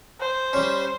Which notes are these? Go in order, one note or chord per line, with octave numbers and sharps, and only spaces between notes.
C5
G3 C#4